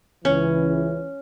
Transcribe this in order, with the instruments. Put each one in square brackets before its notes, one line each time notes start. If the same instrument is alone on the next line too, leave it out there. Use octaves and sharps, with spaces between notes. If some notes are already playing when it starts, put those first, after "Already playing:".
[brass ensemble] C#2 E3 [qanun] C#4